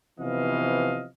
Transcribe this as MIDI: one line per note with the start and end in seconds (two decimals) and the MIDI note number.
0.20 1.06 48
0.20 1.06 52
0.20 1.06 53
0.20 1.06 59
0.20 1.06 75
0.20 1.06 77